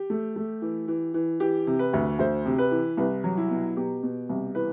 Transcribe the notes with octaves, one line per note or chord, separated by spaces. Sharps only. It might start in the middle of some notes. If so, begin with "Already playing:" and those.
Already playing: G4
A3
A3
E3
E3
E3
E3 G4
C3
B4
D2
D2 C5
C3
B4
E3
C2 B4
F#3
E4
B2
B2 G4
B2
C2
E3 B4